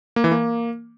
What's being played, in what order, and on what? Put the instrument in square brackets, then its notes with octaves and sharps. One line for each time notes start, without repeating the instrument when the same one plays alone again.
[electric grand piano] A#3
E3
A#3